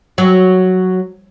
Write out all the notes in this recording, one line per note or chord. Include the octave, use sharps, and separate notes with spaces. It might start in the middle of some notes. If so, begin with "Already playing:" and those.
F#3